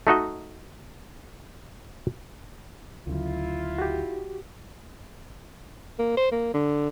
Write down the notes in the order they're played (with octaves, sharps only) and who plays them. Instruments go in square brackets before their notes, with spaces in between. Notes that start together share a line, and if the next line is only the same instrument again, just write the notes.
[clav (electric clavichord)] A3 D#4 F#4 D#5
[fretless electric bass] D2 C#3 F#3 [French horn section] E4 F4
[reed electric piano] F#4 G4
[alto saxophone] A#3
C5
A#3
D3